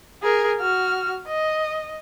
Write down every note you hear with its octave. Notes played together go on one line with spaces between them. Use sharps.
G#4 A#4
F#4 F6
D#5